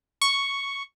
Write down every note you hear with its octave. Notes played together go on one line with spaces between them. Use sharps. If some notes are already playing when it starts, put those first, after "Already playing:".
C#6